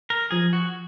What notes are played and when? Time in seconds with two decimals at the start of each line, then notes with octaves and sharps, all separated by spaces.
0.10 A#4
0.31 F3 G#4
0.53 F#4